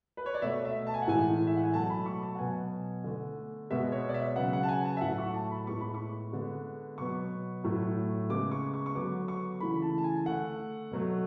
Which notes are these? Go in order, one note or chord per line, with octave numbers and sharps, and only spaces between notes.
B4
C#5
D5
B2 A3 E5
E5
A5
G#5
F#5
A2 E3 G#3 G#5
E5
F#5
G#5
B2 F#3 A3 A5
B5
C#6
A5
F#5
B2 F#3 B3 G#5
D3 A3
B2 G#3 B3 E5
C#5
D5
E5
C#3 F#3 B3 F#5
F#5
A5
G#5
A5
E5
A2 F#3 A3 F#5
C#6
A5
B5
A2 G#3 B3 C#6
B5
C#6
D3 G#3 B3
B2 F#3 B3 C#6
A2 F#3 A3
C#3 G#3 B3 D6
C#6
C#6
C#6
D3 F#3 B3 D6
C#6
C#3 E3 A3 B5
A5
A5
G#5
D3 A3 F#5
B2 F#3 A3